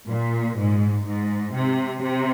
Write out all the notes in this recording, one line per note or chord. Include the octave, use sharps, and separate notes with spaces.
A#2
G#2
G#2
C3
C3